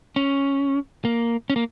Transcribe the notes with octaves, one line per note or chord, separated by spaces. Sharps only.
C#4
A#3
C#4
A#3